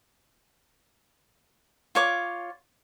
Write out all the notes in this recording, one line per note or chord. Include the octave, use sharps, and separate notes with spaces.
F4 C#5 D6